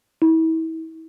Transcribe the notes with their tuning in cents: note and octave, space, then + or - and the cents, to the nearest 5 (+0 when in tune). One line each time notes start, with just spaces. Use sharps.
E4 -35